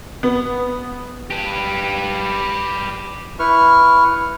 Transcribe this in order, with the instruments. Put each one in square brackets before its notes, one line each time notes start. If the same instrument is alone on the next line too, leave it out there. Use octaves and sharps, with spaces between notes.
[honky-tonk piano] B3
[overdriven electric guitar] G4 B4
[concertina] E4 B4 C#6 F6